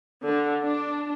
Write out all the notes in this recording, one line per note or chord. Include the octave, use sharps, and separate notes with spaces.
D3
D4